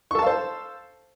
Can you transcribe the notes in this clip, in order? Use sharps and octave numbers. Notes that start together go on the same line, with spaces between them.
A4 C5 F5 A5 C#6